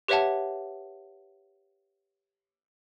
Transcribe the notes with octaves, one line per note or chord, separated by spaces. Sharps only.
G4 B4 C#5 E5 F#5 A5